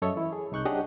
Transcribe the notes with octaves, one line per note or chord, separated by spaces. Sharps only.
F#2 A4 C#5 D#5 E5
E3 E4
G#4
C2 D#4 C#6 F#6 G6
D4 G4 G#4 C#5 D#5 F#5